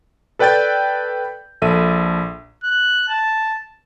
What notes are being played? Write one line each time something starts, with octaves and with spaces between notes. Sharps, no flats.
A4 B4 D5 G5 G6 A6
A#1 A4 E5 D#7
F#6
A5